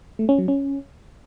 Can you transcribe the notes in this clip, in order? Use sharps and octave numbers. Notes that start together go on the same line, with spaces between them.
A3
C#4
F#3
C#4